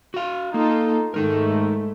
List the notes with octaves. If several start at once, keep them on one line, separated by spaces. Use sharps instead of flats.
F#4 F5
A#3 D#4 F4 A4
G#2 A3 D#4 A#4